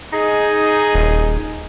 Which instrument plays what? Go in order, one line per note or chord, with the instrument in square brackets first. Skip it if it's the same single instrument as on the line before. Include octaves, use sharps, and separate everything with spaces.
[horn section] D#4 G#4
[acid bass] D#1